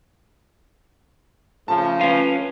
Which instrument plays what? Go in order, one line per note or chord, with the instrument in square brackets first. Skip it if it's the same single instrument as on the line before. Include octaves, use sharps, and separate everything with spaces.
[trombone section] C#3 F3 A3 [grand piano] A5
[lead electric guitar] C#4 F4 [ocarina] B4